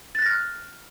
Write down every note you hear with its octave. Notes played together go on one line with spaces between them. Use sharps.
F6 F#6 A6 A#6